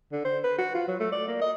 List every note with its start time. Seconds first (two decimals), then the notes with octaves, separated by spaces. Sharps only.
0.12 D3
0.25 C5
0.44 B4
0.58 F#4
0.75 F4
0.88 F#3
1.00 A3
1.13 D5
1.28 A#3
1.41 D#5